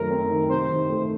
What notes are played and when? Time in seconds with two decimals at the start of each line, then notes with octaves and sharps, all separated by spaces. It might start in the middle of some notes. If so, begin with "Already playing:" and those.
Already playing: F#2 D#3 A3 C4 A#4
0.11 C4
0.30 D#3
0.49 C3 C5
0.70 D#3
0.89 A3